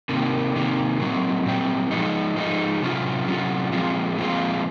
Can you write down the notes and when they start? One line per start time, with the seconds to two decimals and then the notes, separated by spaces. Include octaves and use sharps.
0.09 C3 D#3 A#3
0.56 C3 D#3 A#3
1.00 A#2 F#3 C4
1.46 A#2 F#3 C4
1.91 F3 G#3 D#4
2.36 F3 G#3 D#4
2.82 C3 F#3 C#4 F4
3.27 C3 F#3 C#4 F4
3.72 A#2 F3 G#3 C4 F4
4.17 A#2 F3 G#3 C4 F4